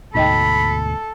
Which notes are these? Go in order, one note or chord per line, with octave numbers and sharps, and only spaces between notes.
D2 G#2 B2 D#4 A4 D#5 G5 B5